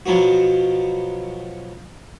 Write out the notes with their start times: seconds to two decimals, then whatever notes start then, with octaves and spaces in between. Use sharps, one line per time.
0.06 B2 F3 F#3 B3 F#4